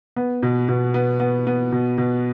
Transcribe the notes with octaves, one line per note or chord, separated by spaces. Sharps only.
B3
B2
B2
B3
B3
B3
B2
B2